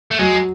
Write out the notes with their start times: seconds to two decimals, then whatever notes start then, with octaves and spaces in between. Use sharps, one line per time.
0.11 A3
0.19 F#3 G#3